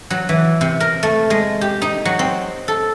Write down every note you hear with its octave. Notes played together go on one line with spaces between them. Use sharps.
F#3
E3
C3
A#4
A3
G#3
G4
D#4
F#3
C4
A4